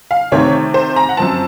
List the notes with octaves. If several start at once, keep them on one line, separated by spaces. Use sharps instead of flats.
F5
C3 D#3 A3 C4 C#5
C5
A#5
F#5
F#2 F3 C4 A5